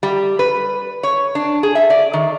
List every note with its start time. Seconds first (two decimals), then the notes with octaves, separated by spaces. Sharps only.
0.03 G3
0.39 B4
1.03 C#5
1.35 D4
1.63 G#4
1.75 E5
1.90 D5
2.13 D#3